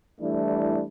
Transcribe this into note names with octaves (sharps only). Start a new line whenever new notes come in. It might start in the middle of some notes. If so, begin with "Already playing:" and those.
E3 G3 A3 D4 E4